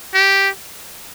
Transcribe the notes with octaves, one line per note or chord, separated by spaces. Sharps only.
G4